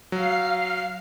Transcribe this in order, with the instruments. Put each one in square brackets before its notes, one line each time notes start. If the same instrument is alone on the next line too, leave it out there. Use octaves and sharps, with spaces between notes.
[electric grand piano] F#3 [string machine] F5 C7